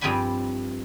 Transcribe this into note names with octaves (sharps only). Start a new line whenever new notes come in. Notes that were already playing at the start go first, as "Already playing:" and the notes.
G2 F3 C4 G5 G#5 B5